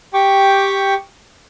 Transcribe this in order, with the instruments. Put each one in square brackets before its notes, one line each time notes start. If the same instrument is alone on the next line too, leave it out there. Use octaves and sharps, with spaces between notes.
[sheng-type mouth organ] G4 G5 C#6 D6